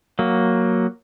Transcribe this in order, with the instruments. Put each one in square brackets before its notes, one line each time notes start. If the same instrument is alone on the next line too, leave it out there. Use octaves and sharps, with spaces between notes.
[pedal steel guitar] F#3 A#3